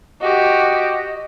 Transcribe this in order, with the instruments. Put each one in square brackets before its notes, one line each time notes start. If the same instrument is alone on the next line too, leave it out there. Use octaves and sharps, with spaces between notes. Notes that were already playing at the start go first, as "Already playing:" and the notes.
[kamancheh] F#4 G4 [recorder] D#5